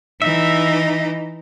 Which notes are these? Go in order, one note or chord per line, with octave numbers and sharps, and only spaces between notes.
E3 D#4 E5